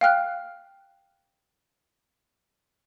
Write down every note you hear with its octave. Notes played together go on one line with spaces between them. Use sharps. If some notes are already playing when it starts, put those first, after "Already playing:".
F5 G5 F6 F#6